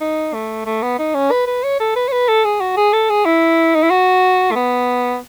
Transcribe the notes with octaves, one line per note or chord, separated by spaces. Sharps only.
D#4
A3
A3
B3
D#4
C#4
B4
B4
C#5
A4
B4
C#5
B4
A4
G#4
F#4
G#4
A4
G#4
E4
D#4
E4
F#4
A3
B3